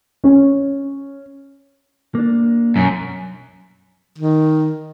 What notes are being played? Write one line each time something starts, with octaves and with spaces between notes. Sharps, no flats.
C#4
A#3 D4
B1 F#2
D#3